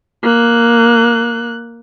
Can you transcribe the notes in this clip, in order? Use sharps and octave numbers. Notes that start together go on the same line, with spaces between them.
A#3 F#6